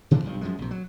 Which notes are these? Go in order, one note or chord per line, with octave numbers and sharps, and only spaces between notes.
C#3 E3 F3 D4
B1 G2 F3
F#2 F3 G#3
A#1 C3
F#3